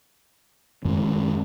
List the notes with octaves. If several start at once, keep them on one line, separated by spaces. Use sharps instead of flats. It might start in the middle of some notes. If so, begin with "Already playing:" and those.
F#2 D#3 G#3 C#4